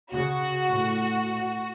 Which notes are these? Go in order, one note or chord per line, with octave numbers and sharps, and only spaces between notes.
C#3 F#4
A2